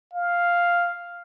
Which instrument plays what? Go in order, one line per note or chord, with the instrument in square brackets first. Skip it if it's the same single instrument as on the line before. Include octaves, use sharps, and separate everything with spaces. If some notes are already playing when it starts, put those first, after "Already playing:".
[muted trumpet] F5